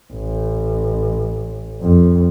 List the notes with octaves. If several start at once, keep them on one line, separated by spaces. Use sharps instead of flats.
A1
F2